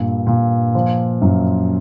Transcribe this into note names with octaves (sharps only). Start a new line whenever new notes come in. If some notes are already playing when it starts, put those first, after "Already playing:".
Already playing: G2 A#2
A#2
F3
F#2